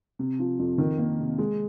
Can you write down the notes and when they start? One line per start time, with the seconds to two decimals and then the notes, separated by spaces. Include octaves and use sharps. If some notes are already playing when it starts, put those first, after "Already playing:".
0.19 C3
0.39 F3
0.59 F2
0.78 D#3
0.98 A#3
1.19 C3
1.38 G#3